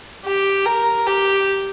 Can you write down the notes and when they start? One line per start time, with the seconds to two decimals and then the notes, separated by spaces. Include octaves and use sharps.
0.25 G4
0.65 A#4
1.06 G4